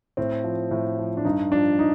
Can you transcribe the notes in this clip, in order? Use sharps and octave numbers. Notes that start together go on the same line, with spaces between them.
A2 C4
F3
A2
F3
D4
G2 D#4
F3 D4
D#4